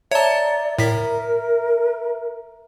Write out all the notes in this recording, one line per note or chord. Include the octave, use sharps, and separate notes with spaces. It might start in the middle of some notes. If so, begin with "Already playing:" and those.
C#5 D5 E5 A5 A#5
A2 A#4 B6